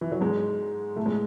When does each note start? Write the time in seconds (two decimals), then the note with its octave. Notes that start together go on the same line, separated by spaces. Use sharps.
0.01 E3
0.12 F#3
0.21 G#2 G#3
0.96 A2 A3
1.06 G#3